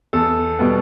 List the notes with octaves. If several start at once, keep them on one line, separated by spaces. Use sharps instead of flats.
E2 A4
B2 G3 B3